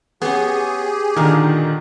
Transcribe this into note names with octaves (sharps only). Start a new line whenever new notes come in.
B3 C#4 G4 G#4
A#2 D3 D#3 A#4